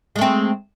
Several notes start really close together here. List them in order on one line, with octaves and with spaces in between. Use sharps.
G#3 A3 C4